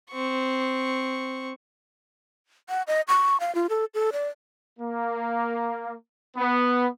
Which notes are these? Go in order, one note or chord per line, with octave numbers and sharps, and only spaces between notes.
C4 C#6
F#5
D#5
C#6
F5
F4
A4
A4
D5
A#3
B3